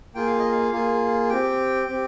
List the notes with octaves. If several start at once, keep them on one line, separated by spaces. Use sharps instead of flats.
A#3 F4 G#4 G5
F5
D#5
F5
A#3 F4 G#4
C4 G4 G5
C4 G4